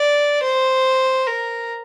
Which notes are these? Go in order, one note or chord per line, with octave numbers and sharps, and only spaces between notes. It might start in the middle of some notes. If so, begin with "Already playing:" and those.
Already playing: D5
C5
A#4